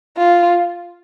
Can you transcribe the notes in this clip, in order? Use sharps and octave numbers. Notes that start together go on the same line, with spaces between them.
F4